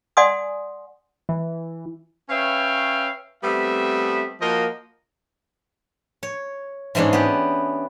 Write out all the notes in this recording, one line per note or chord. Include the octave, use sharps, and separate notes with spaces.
D5 F#5 G#5 C6 D#6
E3
C#4 B4 C#5 E5 F5 G5
G3 A3 B3 C4 E5
F3 A#3 F#4 A#4 C5 D#5
C#5
G#2 E3 G#3 C#4 D4
B3 G4